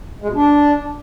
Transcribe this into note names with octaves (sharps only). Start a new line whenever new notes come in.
G#3
B2
D4